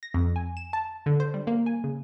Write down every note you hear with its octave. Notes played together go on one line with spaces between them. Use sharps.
A#6
F2
G#5
E7
A5
D3
C5
G3
A#3
G#5
C#3